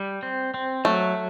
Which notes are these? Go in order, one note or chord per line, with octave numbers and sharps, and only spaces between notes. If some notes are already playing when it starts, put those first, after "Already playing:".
Already playing: G3
C4
C4
F#3 A3